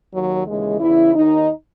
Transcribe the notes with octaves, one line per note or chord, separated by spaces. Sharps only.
D#2 D#3 F#3
D#2 C#3 E3 G#3
E2 C#3 E3 E4
D#2 D#3 D#4